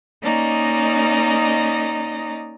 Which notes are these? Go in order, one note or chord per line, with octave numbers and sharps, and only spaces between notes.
A#3 C#4 D#4 D5 D#5 A#5